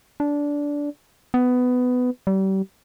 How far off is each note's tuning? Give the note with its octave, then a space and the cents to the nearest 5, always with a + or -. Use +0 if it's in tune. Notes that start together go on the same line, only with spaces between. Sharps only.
D4 -15
B3 +15
G3 -35